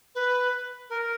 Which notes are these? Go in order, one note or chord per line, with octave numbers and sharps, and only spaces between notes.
B4
A#4